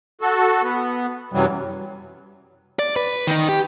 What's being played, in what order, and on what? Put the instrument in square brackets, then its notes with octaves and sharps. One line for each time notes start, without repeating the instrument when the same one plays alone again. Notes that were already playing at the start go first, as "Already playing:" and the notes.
[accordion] F#4 A4
B3
F#2 C3 E3 F#3 G3
[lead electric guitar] D5
B4
D#3 D#4
G4